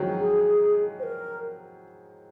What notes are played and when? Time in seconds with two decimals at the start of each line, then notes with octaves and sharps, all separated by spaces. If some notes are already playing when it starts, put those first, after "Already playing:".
Already playing: D#3 F3 F#3 G#3
0.19 G#4
0.99 C5
1.03 A#4